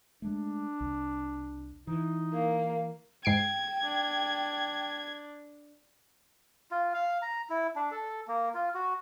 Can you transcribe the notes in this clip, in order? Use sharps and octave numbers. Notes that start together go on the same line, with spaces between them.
G#3 A3 D4
C2
E3 D#4
A#3
G#2 G5 G#6 C7 D7
D4
F4
F5
A#5
E4
D4
A4
A#3
F4
F#4